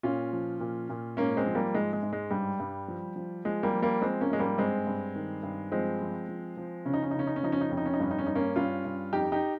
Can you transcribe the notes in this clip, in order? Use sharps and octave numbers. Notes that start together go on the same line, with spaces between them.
A#2 C#4 F4
F3
A#2
A#2
G#2 A#3 C#4
G#3 C4
F3
G3 A#3
G#2 G#3
G#3
G#2
G#3
G2 G3
G2
F3
F3
F3 G#3
G3 A#3
F3
G3 A#3
F3 G#3 C4
A#3 C#4
G#2 G#3
G3 A#3
G2 G#3 C4
G2
D#3
G2
F3 G#3 C4
F3
F3
F3
C#3 C#4
D#4
C#4
D#4
C#3 C#4
D#4
C#4
F3 D#4
C#4
D#4
F2 C#4
D#4
C#4
D#4
G2 C#4
D#4
C#4
G2 D#4
A#3 C#4
G2 C#4 F4
G2
F2 D#4 G4
D#4 G4